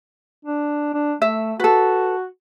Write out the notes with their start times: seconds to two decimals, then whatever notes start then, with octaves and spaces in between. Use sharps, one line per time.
0.45 D4
0.93 D4
1.22 A3 E5
1.60 F#4 A4 B4